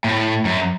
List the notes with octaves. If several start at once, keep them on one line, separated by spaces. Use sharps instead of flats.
A2
F#2